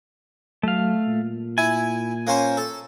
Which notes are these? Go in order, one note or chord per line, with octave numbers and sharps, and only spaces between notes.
F#3 A3 F5
A#2
E4 G#5
A#3 C#4 C5
A4